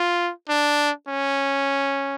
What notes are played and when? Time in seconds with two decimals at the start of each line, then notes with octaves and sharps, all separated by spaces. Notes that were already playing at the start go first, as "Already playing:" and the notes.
Already playing: F4
0.49 D4
1.08 C#4